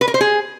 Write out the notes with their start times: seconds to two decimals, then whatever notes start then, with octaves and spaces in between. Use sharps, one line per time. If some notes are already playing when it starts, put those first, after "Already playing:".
0.01 B4
0.08 A#4
0.14 C5
0.21 G#4